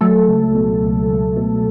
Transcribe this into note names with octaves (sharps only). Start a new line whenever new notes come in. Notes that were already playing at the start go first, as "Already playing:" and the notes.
F#3 A3 A4
C#2
B2
C#2
C#2
B2